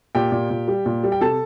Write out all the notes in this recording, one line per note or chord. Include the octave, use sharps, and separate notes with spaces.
A#2 G4 G5
A#2
A#2
G3
A#2
G3
G5
C3 A4 A5